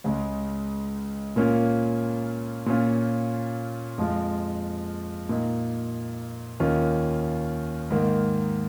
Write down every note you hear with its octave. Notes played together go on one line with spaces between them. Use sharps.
C#2 C#3 G#3
A#2 A#3 C#4 F4
A#2 A#3 C#4 F4
F2 F3 G#3 F4
A#2 A#3 D#4
D#2 D#3 C#4 F4
G#2 D#3 A#3